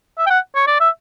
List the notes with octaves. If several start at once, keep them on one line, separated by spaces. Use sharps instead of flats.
E5
G5
F#5
C#5
D5
E5